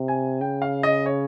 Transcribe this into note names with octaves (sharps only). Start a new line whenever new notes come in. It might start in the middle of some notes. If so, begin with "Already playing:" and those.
Already playing: C3
G#5
C#3 G5
F5
D#5
C#5